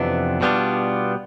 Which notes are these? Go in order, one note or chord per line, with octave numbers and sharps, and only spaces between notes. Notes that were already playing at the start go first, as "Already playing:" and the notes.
Already playing: F2 C3 E3 B3 D4
B2 G3 B3 D4 F4